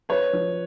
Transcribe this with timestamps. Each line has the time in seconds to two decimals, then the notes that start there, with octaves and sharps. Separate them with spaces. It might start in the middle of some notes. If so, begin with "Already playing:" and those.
0.09 C#4 B4 C#5
0.33 F3